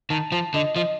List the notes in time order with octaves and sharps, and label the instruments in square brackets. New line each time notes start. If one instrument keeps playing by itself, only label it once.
[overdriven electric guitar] D#3 [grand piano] A5
[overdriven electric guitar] F3 [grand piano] A5
[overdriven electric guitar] D3 [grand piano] D#5
[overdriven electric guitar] F3 [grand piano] D#5